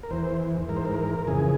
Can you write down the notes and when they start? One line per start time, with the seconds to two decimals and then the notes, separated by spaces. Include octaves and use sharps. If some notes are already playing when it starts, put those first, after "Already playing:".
0.03 A#4
0.11 E2 E3 C5
0.68 G#2 E3 A#4
0.77 C5
0.85 A#4
1.27 F2 C#3 E3 G#4